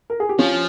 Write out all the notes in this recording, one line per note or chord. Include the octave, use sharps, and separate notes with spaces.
A#4
G#4
G4
F3 C#4 F4